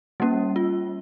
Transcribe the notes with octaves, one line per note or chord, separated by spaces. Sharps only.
G3 A#3 C#4
F4